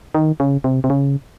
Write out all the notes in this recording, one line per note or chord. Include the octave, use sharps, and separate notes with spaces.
D#3
C#3
C3
C3
C#3